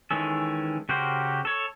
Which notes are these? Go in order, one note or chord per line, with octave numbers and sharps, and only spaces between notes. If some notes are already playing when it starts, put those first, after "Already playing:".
D#3 E3 G#3 C#4 A4
C#3 F#4 G4 A#4 C5
A4 C#5